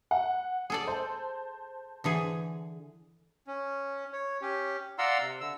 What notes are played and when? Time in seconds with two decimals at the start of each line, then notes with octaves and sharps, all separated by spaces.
0.11 F#5
0.70 G#4 A4 D5
0.87 C5 A5
2.04 D3 E3 G#4
3.47 C#4
4.13 C#5
4.41 C#4 G4
4.98 D5 F5 F#5 A#5 C6 E6
5.20 C3
5.41 D3 E6